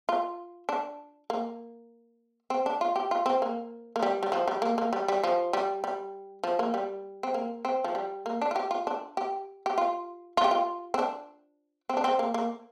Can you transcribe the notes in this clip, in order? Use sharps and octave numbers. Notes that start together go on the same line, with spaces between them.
F4
D4
A#3
C4
D4
F4
G4
F4
C4
A#3
A#3
G3
G3
F3
G3
A#3
A#3
G3
G3
F3
G3
G3
F3
A#3
G3
C4
A#3
C4
F3
G3
A#3
D4
F4
G4
F4
D4
G4
G4
F4
F4
G4
F4
C4
D4
C4
D4
C4
A#3
A#3